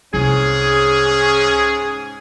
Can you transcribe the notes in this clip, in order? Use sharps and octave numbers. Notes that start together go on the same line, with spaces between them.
C2 G#2 C#4 G#4